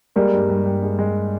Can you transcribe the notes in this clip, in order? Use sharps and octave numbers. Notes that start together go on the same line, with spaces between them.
G3 G#3 A#3
G2
G2
G2
G#3
G#3